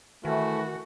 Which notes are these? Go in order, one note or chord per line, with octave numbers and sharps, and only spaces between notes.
D#3 E3 A3 F#4